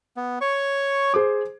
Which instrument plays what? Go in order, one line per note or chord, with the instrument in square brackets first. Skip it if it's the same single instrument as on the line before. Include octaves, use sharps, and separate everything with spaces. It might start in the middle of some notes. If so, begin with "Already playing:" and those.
[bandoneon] B3
C#5 C#6
[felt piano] G#4 C5 D6